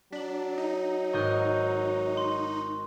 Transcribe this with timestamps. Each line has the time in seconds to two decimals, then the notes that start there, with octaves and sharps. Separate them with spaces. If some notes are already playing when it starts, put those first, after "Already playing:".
0.12 F#3 D4 B6 F#7
0.58 D#4
1.13 G#1 D#5 C#6 F#6 G6
2.17 C6